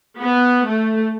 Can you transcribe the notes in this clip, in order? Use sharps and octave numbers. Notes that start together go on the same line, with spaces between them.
B3
A3